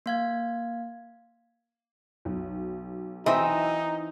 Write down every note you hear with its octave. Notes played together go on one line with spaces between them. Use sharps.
A#3 F5 G#6
B1
E3 C4 D#4 D#5 E5